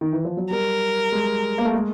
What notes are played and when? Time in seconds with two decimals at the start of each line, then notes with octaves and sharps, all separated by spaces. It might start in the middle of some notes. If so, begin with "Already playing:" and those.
0.01 D#3
0.12 E3
0.25 F3
0.37 F#3
0.50 G3 A#4
1.12 G#3
1.58 A#3
1.65 A3
1.74 G#3